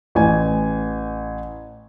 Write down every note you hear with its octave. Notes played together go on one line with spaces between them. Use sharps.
A1 G#5